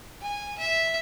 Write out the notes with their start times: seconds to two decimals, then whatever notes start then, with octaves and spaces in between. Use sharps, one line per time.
0.21 G#5
0.58 E5